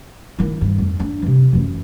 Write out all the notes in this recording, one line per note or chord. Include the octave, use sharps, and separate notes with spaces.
D#3 E4
G2
F2 G#2
D4
C3 E3
F#2 E3